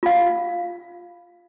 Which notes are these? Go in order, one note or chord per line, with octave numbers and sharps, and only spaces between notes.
F4 F5